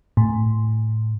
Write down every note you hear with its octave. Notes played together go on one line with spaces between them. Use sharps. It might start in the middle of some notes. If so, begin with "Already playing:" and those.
A2